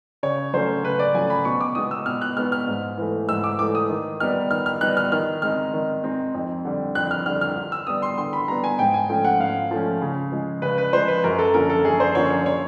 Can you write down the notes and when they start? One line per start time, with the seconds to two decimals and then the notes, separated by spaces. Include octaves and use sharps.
0.23 C#3 C#5
0.54 F#3 A3 C#4 C5
0.83 C#3 B4
0.99 D5
1.14 F#3 A3 C#4 G#5
1.30 B5
1.45 B2 C#6
1.61 D6
1.75 G#3 B3 D#4 D#6
1.91 E6
2.06 B2 F6
2.21 F#6
2.37 G#3 B3 D#4 F6
2.52 F6
2.67 G#2
2.97 E3 A3
3.28 G#2 E6
3.44 D6
3.59 E3 A3 D6
3.75 D#6
3.90 D#3
4.20 G3 B3 D#4 F6
4.51 D#3 F6
4.66 F6
4.81 G3 B3 D#4 F#6
4.97 F6
5.12 D#3 F6
5.42 G#3 C4 D#4 F6
5.74 D#3
6.04 G#3 C4 D#4
6.34 F2
6.65 D3 G3
6.95 F2 F#6
7.11 F6
7.26 D3 G3 F6
7.41 F6
7.56 D3
7.72 E6
7.87 G3 B3 D#6
8.02 C6
8.18 D3 C6
8.33 B5
8.48 G3 B3 A#5
8.64 G#5
8.79 G#2 G5
8.94 G#5
9.09 F3 A3 C#4 G5
9.25 F#5
9.40 G#2 F5
9.71 F3 A3 C#4
10.01 C#3
10.32 F3 G#3
10.62 C#3 B4
10.78 B4
10.93 F3 G#3 C5
11.08 B4
11.24 F#2 A#4
11.39 A4
11.54 D3 F3 A#3 C#4 A#4
11.70 A4
11.85 F#2 G#4
12.00 C5
12.15 D3 F3 A#3 C#4 C#5
12.30 C#5
12.46 C#5